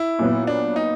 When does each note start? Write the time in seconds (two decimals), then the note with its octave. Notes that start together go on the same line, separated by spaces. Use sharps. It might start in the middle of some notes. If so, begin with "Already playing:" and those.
Already playing: E4
0.19 A#2 F#3 B3
0.47 D4
0.76 D#4